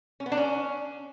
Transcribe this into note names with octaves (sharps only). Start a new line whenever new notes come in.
C#4
B3
D4
C#4